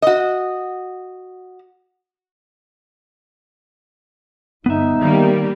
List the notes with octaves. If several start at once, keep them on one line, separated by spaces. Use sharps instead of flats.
F#4 D#5
G1 B3 D#4 E5
D#3 G3 A#3